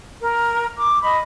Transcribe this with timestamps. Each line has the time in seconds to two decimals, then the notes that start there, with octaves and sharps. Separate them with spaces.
0.21 A#4
0.78 D6
1.02 D#5 B5